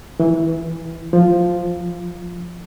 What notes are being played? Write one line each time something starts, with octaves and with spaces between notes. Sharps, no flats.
E3
F3